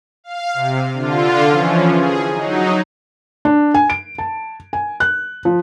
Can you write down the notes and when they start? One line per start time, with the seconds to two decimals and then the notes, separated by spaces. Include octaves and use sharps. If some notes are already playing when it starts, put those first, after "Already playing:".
0.24 F5
0.54 C3
0.94 D3 F4
1.49 E3 F3 C#4
1.94 G#4
2.30 F#3 D#4
3.45 D4
3.74 G#5
3.90 D7
4.18 A5
4.73 G#5
5.00 F#6
5.45 F3